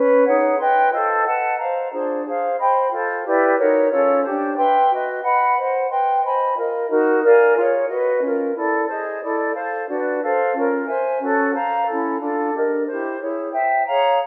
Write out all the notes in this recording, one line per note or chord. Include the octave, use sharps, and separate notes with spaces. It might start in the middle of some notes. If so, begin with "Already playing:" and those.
Already playing: C#4 B4
D#4 G#4 C#5 F#5
B4 D#5 G5 C6
F4 A4 C5 D#5
B4 D#5 F#5 A5
C5 F5 A#5
D4 F4 G#4 C5
G#4 C5 F5
C5 D#5 G5 B5
F4 A4 C5
E4 G4 B4 D5
D#4 F#4 A#4 C#5
C#4 F4 A4 C#5
D4 G4 C5
B4 E5 G5 C6
F#4 B4 D#5
B4 D#5 F#5 B5
C5 D#5 F#5
B4 D#5 G5 C6
C5 D#5 G#5 B5
F4 A#4 D#5
D#4 F#4 A#4
A#4 D5 F5 G#5
F4 G#4 C#5
F#4 B4 D#5
C#4 F4 A#4
E4 A4 D5
G#4 C5 D#5
E4 A4 D5
A4 C5 F5
D4 F#4 B4 D5
A4 C5 F5
C#4 F4 A#4
C5 E5 G#5
C#4 F#4 A4
C5 F5 A#5
C#4 E4 A4
D4 F4 A4
D4 G4 A#4 D#5
E4 G4 C5
E4 G#4 C#5
C5 E5 G5
G#4 C#5 F5 A#5